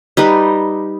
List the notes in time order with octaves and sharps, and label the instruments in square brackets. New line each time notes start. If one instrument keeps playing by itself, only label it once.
[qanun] G3 D#4 B4